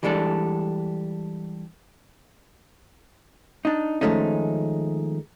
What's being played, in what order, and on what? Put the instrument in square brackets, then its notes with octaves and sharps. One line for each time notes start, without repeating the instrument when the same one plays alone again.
[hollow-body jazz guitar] E3 G3 G#3 D4 A4
D4 D#4
D#3 F3 G#3 A3 C#4 D#4